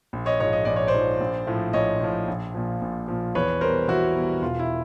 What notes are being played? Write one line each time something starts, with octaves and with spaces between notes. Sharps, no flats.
A#1
C#5 D#5
G#2 F3 C#5 D#5
D#5
A#1 D5
C#5
C5 D5
G#2 F3
A#1
A2 F3
A#1 C#5 D#5
A2 F3
A#1
A#2 F3
A#1
A#2 F3
E2 B4 C#5
B2 G3 A#4 C5
E2 E4 F#4
B2 G3
E1 F4
E4